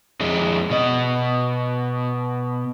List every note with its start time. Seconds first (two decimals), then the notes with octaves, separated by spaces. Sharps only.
0.21 F2 G#3
0.71 B2 D#5